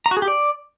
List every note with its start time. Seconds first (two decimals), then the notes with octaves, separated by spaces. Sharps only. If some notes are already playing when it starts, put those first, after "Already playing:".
0.06 A#5
0.11 F#4
0.17 G#4
0.22 G4
0.28 D5